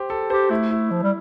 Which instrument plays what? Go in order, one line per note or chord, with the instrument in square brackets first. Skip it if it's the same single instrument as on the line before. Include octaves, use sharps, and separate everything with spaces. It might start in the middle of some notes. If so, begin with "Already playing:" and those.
Already playing: [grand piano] G4 C5
A4
[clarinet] G4 [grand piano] C5
[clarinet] A3 [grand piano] E4
[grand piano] E4
[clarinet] F3
G3